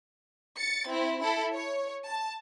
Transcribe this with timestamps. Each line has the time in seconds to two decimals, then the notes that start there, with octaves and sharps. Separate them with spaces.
0.56 A6 C#7
0.90 C4 E4
1.20 E4 A4
1.54 C#5
2.07 A5